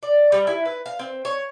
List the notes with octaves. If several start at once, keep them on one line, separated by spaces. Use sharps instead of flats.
D5
G3
E4
B4
F5
C4
C#5